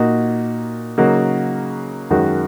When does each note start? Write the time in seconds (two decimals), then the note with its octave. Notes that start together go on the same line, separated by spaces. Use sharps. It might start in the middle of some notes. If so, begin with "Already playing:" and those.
Already playing: A#2 A#3 D#4 F#4
0.98 C#3 F#3 A#3 D#4 F#4
2.10 F#2 D#3 G#3 F#4